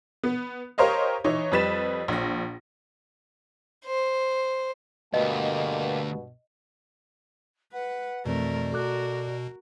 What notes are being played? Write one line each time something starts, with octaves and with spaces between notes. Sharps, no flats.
B3
G4 A#4 C5 C#5 D#5 F5
E3 D#4 C#5
F2 G3 B4 A6 B6 E7
A#1 A#6
C5
D2 G2 B2 A#3 D#5 G5 A5
B4 F#5
F2 B2 E3 A3 C4 A#4 D5
F#4 A4 A#4 D6 F#6